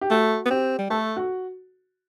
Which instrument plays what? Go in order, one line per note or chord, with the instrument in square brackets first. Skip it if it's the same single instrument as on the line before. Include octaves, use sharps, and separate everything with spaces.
[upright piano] G4
[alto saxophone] A3 [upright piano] F#4
[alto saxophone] B3
[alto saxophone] C4 [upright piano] G4
[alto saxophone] G3
[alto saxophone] A3 [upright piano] A4
[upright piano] F#4